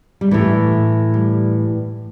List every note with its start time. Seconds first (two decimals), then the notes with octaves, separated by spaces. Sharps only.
0.21 G3
0.31 A2 E3 A3
1.14 G3